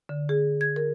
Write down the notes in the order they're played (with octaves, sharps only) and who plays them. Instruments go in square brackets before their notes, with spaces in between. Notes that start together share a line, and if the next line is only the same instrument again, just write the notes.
[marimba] D3
G#4
G#6
A#4